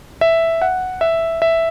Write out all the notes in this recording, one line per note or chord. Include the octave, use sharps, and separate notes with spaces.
E5
F#5
E5
E5